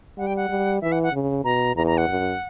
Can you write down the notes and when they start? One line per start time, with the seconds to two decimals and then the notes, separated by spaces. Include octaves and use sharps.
0.18 G3 F#5
0.27 G5
0.36 F#5
0.49 G3
0.81 E3 E5
0.92 F#5
1.03 F#5
1.12 C#3
1.44 B2 A#5
1.75 E2 A#5
1.87 A#5
1.98 F#5
2.08 F#2